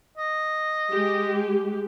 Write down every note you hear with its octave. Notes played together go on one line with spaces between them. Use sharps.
D#5
G#3 G4